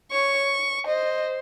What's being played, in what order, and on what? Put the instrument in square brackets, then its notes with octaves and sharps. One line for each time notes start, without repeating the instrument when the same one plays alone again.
[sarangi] C#5 [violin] C#6
[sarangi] C5 [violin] D#5